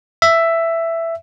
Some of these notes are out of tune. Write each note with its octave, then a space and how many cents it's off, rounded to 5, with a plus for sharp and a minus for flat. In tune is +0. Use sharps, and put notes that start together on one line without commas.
E5 +10